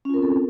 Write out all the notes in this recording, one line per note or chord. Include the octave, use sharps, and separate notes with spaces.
C4 C#4 F4 A4 A#4